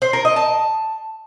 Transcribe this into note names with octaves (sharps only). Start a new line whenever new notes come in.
C5
A#4
D#5
A5